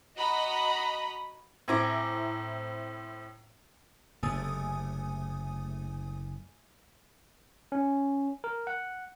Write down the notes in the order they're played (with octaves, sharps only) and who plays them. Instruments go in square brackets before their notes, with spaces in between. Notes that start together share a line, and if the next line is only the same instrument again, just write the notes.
[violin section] F#4 D#5 A#5 B5
[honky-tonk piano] A2 C4 E4 [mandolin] G#5 A#5 D6
[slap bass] F#1 C3 [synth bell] A3 G#5 D#6
[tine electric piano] C#4
A#4
F#5